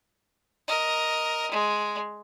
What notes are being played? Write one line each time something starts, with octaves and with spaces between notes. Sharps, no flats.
A#4 D#5
G#3